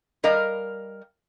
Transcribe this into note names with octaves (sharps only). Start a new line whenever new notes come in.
G3 A#4 D#5 F5